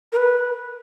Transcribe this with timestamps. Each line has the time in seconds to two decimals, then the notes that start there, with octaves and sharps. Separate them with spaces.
0.12 A#4
0.17 B4